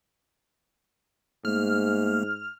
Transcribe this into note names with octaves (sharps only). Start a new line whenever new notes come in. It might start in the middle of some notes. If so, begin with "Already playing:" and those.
G#2 A3 A#3 F6